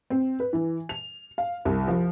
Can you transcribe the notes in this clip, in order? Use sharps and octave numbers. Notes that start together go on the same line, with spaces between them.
C4
B4
E3
F7
F5
C2
F3